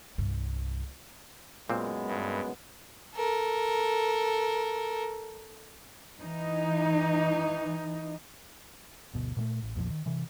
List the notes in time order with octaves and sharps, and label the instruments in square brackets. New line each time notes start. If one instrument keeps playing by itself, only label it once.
[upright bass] C2 G2
[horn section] F#2 B3 [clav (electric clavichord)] A#2 C4 [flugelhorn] G#3
[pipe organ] G2
[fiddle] A4 A#4
[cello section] E3 D#4
[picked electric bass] G1 D2 B2
A#2 G3 A3
A1
A#1 E2 A#2 F3
D#3
C3 E3